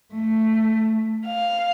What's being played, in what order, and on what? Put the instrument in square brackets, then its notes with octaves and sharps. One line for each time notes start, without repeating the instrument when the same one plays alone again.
[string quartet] A3
F5